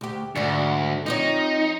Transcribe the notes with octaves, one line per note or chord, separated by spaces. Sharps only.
D2 G4
D2 G#2 D3 D4
F3 C4 D#4 C#5